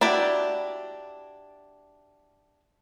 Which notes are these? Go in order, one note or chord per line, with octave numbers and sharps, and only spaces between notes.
D4 E4 F#4 G4